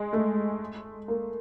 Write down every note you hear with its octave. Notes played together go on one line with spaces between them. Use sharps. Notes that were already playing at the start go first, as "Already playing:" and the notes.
Already playing: G#3
A3
A#3